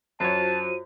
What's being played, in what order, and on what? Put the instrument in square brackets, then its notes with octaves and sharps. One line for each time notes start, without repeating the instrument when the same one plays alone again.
[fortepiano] F#2 C#5 [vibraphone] F4 F#4 C5 [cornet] A5 [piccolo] D#7